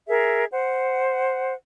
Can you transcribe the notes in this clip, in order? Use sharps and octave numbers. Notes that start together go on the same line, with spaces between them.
G#4 A#4 E5
C5 F#5